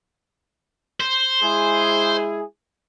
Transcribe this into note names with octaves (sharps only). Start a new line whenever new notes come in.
C5
G#3 E4 G#4